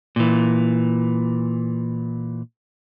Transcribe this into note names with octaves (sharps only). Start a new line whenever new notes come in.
A#2 E3